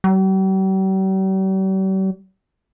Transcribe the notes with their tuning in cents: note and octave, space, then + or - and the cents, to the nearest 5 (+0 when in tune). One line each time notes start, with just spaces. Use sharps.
G3 -45